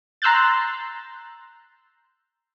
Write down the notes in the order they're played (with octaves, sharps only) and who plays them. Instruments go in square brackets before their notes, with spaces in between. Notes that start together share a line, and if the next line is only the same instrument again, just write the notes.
[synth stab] A#5 C6 E6 F#6 G6 A6